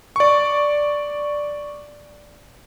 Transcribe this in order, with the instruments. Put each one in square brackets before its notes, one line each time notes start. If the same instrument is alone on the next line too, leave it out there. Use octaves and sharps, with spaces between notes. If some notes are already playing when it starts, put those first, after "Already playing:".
[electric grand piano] D5 C#6